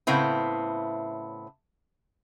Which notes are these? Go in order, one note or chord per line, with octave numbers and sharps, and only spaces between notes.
A2 C#3 B3 C4 E4